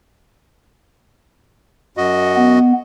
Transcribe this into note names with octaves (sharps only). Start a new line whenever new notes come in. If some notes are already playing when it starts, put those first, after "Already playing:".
F#2 F#4 D#5
B3